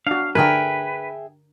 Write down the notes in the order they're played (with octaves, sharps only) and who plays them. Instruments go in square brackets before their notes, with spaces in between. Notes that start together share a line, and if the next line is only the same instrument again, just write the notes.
[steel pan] D4 F#4 [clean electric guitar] F5
[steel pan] D3 A#4 [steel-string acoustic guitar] G#4 E5 G5 [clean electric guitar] B4